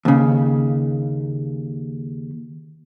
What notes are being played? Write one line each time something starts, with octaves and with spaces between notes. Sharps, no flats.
D#2 C#3